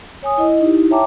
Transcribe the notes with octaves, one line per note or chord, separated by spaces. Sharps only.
C#5 G#5 D#6
E4 D#5
D#4 E4 G4
C#5 E5 G5 A5 A#5 D6